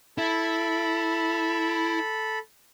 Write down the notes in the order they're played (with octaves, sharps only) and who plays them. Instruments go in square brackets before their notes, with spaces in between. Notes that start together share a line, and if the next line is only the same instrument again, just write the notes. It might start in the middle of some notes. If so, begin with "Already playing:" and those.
[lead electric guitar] E4 [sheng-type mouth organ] A4 B5